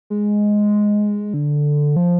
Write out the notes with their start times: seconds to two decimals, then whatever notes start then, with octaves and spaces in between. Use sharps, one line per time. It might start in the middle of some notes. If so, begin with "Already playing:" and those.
0.10 G#3
1.34 D3
1.96 F3